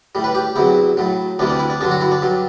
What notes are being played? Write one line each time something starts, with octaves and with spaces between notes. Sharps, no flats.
A2 G3
B4
G4
E2 C3 F#3 E4
A2 F#3
D2 C3 E3 G3 D4
D4
E4
D4
G2 D3 F#3 D4
F#4
E4
D4
G2 F#3